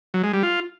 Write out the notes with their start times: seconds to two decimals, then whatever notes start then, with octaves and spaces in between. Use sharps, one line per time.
0.14 F#3
0.24 G#3
0.33 G3
0.43 F4